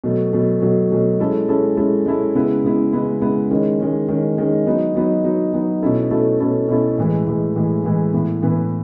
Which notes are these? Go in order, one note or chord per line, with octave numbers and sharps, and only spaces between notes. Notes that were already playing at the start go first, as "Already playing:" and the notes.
B2 F#3 A3
B2 F#3 A3
B2 F#3 A3
B2 F#3 A3
G#3 C#4 E4 A4
G#3 C#4 E4 A4
G#3 C#4 E4 A4
G#3 C#4 E4 A4
C#3 G#3 B3 E4
C#3 G#3 B3 E4
C#3 G#3 B3 E4
C#3 G#3 B3 E4
D#3 G#3 C#4
D#3 G#3 C#4
D#3 G#3 C#4
D#3 G#3 C#4
F#3 B3 D#4
F#3 B3 D#4
F#3 B3 D#4
F#3 B3 D#4
B2 A3 C#4 E4 A4
B2 A3 C#4 E4 A4
B2 A3 C#4 E4 A4
B2 A3 C#4 E4 A4
A2 E3 G#3
A2 E3 G#3
A2 E3 G#3
A2 E3 G#3
A2 E3 B3
A2 E3 B3